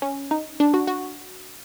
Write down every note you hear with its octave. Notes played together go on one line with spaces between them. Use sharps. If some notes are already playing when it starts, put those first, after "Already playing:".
C#4
D#4
D4
F#4
F#4